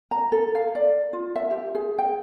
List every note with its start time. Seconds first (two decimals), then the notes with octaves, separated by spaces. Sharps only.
0.11 A#5
0.32 A4
0.55 F5
0.75 D5
1.13 F4
1.36 E5
1.51 G4
1.75 G#4
1.98 G5